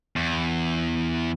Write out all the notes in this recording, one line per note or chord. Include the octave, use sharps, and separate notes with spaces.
E2